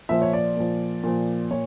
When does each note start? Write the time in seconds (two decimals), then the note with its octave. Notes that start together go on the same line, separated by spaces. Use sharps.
0.09 A#2 F3 E5
0.22 C#5
0.33 D5
0.57 A#2 F3
1.04 A#2 F3
1.51 A#2 C#5